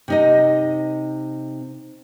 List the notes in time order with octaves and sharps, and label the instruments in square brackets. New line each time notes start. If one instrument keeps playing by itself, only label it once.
[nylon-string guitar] C3 D#4 D#5